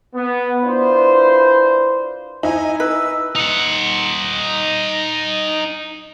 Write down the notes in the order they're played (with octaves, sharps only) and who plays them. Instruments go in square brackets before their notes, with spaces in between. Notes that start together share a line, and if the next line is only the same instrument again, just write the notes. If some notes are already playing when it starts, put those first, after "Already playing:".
[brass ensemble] B3
D4 E4 F4 B4 C5
[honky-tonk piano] D#4 E4 [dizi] G#5
[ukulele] B4 [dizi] E6
[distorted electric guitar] D#4 F#5